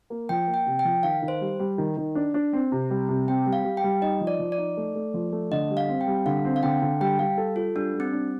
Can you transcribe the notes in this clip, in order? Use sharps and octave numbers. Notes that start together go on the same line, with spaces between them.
A#3
F3 G5
A#3
G5
C3
G5
F3
D#3 F5
D#3
C5
G3
G3
D#3
D#3
D4
D4
C4
C3
G3
C3
C4 G5
G3
F5
G3
G5
G3
D#4 D#5
F3
D5
F3
D5
D#4
A3
A3
F3
A3
D3 D#5
G3
F5
C4
G5
G3
D3 F5
C4
F5
D3 G5
D3
G3 G5
G3 F5
A4
F4 A4
G3 D4
G3
C4
D4